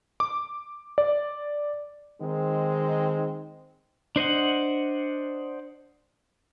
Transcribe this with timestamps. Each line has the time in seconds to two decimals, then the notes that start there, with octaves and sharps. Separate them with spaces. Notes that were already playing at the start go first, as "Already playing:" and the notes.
0.20 D6
0.98 D5
2.22 D#3 G#3 C4 D#4
4.16 D4 C5 D#5 F#5